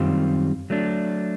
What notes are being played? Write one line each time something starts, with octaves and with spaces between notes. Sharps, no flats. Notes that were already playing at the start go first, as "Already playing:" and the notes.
Already playing: F#2 D#3 G3 C4 F4
F#3 A3 D4